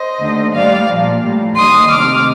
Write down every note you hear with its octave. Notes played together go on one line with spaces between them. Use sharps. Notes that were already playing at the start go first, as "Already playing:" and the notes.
Already playing: C5 D#5
D#2 D3 A3
A2 G3 A#3 D5 F5
A#2 F3 A#3
A2 G3 A#3
D#2 D#3 G3 C6 D#6
D2 C3 D#3 A3 D6 F6